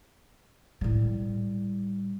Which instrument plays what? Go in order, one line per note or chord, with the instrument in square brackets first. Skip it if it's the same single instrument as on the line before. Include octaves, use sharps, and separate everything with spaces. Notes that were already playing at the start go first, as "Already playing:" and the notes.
[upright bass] A2 G3